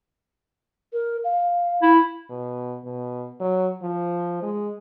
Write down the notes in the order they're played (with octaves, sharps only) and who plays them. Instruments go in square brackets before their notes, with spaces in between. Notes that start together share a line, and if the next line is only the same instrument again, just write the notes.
[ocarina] A#4
F5
[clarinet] E4
[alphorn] B2
B2
F#3
F3
G#3